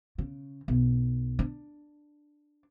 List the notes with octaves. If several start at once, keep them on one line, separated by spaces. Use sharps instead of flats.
C#3
B1
D4